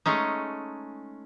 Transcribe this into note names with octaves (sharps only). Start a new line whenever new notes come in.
G#3 A3 C#4 D#4